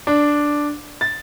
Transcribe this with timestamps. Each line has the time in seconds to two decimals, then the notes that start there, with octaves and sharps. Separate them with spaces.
0.07 D4
1.01 A6